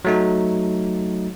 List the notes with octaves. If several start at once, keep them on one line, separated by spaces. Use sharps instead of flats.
F#3 A3 D#4